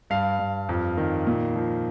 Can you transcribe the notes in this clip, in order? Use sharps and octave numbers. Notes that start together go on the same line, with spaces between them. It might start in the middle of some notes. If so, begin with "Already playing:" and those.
G2 F5
G2
F2
D#3
A#2
F3